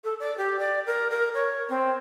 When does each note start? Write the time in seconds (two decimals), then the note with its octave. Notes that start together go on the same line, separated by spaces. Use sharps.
0.04 A4
0.20 D5
0.37 G4
0.59 D5
0.86 A#4
1.10 A#4
1.34 C#5
1.69 C4